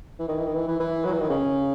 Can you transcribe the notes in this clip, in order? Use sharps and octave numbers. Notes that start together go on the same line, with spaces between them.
E3
D#3
E3
D#3
E3
E3
E3
F#3
E3
D#3
C#3